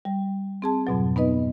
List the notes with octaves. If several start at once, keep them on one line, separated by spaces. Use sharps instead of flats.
G3
C4 G#4 A5
F2 G#2 B2 F#3
B3 D#4 B4 D#5